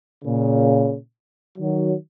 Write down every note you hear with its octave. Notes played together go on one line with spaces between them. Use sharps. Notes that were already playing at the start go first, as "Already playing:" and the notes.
A#2 C#3
D#3 F#3